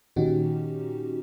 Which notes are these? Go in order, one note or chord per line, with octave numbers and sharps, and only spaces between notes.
A#2 D#3 C#4 D#4 F#4 G4